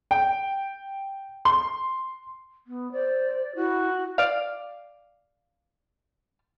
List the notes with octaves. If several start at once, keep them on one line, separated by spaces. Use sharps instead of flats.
G5
C6
B3
C5 D5
E4 F#4
D5 F5